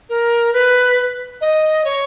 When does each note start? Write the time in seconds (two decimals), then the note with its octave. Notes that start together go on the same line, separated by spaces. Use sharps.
0.09 A#4
0.53 B4
1.41 D#5
1.84 C#5